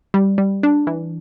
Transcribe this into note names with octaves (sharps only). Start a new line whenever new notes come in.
G3
G3
D4
E3